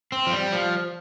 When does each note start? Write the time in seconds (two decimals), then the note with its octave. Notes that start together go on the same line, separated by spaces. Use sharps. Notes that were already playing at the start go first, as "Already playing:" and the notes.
0.12 C4
0.27 F3
0.32 G3
0.52 F3